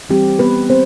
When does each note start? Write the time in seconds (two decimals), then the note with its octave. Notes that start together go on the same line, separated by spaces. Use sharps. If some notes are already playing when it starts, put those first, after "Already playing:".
0.09 E3 G3 C4 G4
0.39 B3 B4
0.70 C4 C5